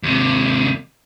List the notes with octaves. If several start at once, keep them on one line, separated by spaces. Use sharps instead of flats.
D#2 C3